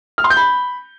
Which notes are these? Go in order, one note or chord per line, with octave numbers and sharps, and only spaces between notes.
F6
C6
G6
B5